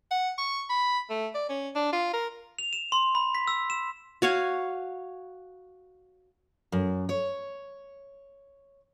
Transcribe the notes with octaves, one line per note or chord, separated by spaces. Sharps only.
F#5
C#6
B5
A3
D5
C#4
D4
F4
A#4
F7
E7
C6
B5
B6
E6
E7
F#4 C#5 F5 G#5
F#2
C#5